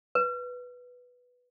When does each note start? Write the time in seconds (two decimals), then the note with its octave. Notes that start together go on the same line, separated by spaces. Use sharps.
0.15 B4